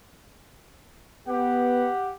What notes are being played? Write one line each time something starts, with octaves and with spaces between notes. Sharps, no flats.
B3 G4 F#5